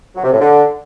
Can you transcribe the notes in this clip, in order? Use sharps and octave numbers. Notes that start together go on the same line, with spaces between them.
F#3
C3
A2
D3